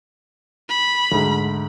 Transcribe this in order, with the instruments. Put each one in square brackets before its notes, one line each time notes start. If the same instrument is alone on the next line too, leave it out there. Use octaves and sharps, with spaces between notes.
[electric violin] B5
[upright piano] D2 G#2